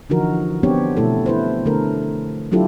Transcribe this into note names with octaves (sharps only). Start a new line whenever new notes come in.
D3 E3 F3 D#4 F#4 A#4
B3 C4 D4 G4 C#5
B2 A3 E4 A4
E4 B4 C5
D3 A3 D4 A4 A#4
F#3 D4 E4 F4 G4 A4